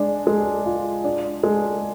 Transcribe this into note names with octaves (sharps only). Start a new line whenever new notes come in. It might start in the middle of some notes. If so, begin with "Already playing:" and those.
Already playing: G#3 D4
G#3
F4
D4
G#3